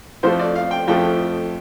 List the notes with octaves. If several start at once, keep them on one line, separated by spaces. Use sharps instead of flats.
F2 F3 A3 C5
D5
F5
G5
F2 F3 A3 G5